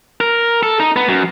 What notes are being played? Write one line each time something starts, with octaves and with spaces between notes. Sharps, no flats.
A#4
A4
D#4
B3
F#2